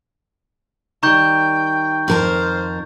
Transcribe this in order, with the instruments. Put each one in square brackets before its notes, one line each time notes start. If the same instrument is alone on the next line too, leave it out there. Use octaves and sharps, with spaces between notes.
[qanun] D#3 G3 [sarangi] G5 [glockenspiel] A#5 C#6 G6
[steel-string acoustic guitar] F2 A#4 A5 [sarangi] C5